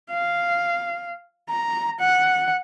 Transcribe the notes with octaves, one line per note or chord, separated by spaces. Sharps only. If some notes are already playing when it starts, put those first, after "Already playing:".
F5
A#5
F#5